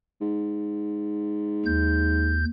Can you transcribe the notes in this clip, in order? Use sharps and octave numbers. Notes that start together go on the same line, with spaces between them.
G#2
D#2 G6